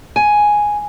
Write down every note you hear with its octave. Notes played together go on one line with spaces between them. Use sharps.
G#5